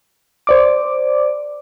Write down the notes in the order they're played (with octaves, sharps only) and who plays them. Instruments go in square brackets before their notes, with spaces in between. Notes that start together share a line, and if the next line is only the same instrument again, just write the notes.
[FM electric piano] C5 D5 D6